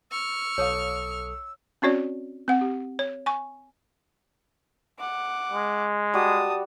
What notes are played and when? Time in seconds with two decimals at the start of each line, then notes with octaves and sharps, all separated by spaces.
0.11 C#6 E6 F6
0.58 B1 A4 C#5 F5 D#6
1.82 C4 C#4 F#4 C#5 D5
2.48 C4 F#5
2.61 G4
2.99 C#5
3.26 G#5 C#6
4.99 F#5 D6
5.52 G#3
6.14 G3 F#4 A5 D#6